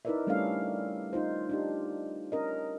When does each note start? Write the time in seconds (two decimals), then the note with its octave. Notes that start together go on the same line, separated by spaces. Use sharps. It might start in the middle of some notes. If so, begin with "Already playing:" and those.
0.05 D#4 E4 A#4 B4 D5 E5
0.27 G3 A3 C#4 D4 A4 F5
1.13 D#4 F4 C5
1.49 D4 D#4 G4
2.32 C#4 A#4 D#5